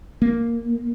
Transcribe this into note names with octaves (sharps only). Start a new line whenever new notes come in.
A#3